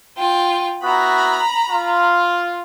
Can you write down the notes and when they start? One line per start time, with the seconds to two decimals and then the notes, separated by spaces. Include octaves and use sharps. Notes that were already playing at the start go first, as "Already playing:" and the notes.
0.17 F4 G5
0.83 B3 E4 F#4 A#5 B5
1.70 F4